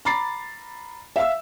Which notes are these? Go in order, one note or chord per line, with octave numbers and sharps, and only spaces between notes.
A#5 B5 D6 A6 C7
E5 F5 E6